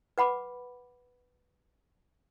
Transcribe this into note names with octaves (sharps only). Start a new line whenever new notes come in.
B4 F#5 B5 D6